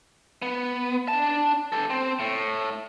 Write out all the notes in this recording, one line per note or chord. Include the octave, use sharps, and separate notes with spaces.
B3
D4 A5
G4 A4
C4
A2